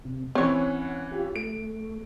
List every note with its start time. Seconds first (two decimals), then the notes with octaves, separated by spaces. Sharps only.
0.05 C3
0.35 E3 C4 C#4 C#5 F#5
1.12 F4 G4
1.36 A3 D7